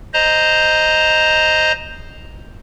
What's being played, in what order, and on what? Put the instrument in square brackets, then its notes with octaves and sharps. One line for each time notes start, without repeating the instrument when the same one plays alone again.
[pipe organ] C5 D#5 A#5